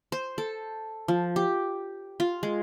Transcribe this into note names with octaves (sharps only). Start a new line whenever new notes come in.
C5
A4
F3
G4
F4
G#3